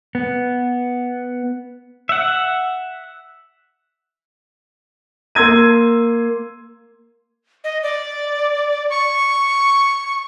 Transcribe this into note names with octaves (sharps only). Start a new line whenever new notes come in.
B3
E5 F#5
A#3 C6 E6 G#6 D#7
D#5
D5
C#6